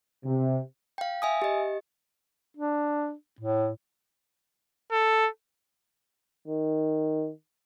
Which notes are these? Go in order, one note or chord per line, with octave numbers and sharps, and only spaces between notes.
C3
F5 G5
E5 G#5 D#6
G4 D#5
D4
A2
A4
D#3